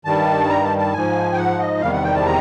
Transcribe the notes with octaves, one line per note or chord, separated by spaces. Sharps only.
G2 D#3 G3 A5
A#5
A5
A5
G#2 F3 G#5
G5
F#5
D#5
E2 C3 D#3 G3 F5
F#5
G5
A5
A#5